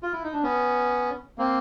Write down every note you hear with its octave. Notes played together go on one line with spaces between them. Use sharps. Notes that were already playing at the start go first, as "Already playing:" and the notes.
F4
E4
D#4
D4
B3 C#4
A#3 C4